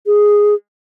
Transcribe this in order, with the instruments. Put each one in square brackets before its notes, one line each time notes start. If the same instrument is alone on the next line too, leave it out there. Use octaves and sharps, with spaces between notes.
[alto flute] G#4